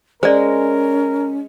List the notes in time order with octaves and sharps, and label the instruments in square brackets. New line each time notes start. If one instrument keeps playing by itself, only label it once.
[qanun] G#3 [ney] C#4 [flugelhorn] A#4 [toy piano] C5 D5